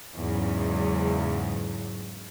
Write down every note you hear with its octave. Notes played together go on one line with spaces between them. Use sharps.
E2 G#2 C#3 F#3